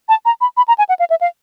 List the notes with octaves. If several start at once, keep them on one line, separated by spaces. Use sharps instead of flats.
A5
A#5
B5
B5
A#5
G#5
F#5
F5
E5
F5